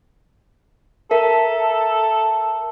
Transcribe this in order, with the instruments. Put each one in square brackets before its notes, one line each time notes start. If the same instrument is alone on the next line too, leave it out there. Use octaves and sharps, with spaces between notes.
[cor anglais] A4 [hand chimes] A#4 E5